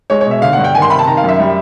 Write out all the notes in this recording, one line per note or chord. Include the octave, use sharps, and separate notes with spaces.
G#3 C#5
C#5
B2 E5
D3 F5
F#5
G2
G5
D#3 G#5
C6
C3 B5
A5
D#3 A#5
F5
F#2 E5
G3